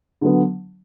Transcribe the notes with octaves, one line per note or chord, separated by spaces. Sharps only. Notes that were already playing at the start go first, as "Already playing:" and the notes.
D3 F#3 B3